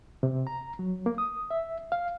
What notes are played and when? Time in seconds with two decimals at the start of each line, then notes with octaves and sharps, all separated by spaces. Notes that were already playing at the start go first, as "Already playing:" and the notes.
0.23 C3
0.47 A#5
0.79 F#3
1.06 A#3
1.18 D#6
1.50 E5
1.92 F5